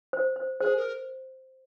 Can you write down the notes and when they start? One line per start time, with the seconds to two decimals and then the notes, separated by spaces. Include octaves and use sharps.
0.13 C5
0.36 C5
0.60 G#4 C5
0.76 A#4